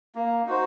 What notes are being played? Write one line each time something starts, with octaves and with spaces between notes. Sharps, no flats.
A#3
D#4 F#4 C5